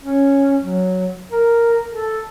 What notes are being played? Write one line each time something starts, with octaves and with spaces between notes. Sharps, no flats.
C#4
F#3
A#4
A4